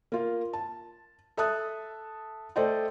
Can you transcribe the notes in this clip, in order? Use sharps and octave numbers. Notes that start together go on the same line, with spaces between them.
A#3 F4
A5
A4 E5 A5 D#6 F#6
A3 A4 C5 D5 D#5 G5